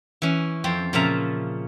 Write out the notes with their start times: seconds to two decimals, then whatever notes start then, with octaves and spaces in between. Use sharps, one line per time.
0.22 E3 C#4
0.64 F2 C4
0.93 A#2 C#3 F3 E5 A#5